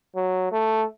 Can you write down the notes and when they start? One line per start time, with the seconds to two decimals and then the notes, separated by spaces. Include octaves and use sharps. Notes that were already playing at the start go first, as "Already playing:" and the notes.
0.16 F#3
0.52 A3